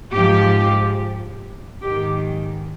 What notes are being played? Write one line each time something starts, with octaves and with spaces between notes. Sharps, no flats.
G#2 F3 G4
G#2 D#3 G4